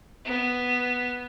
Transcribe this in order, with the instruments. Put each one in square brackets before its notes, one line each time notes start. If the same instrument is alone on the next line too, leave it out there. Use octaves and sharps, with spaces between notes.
[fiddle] B3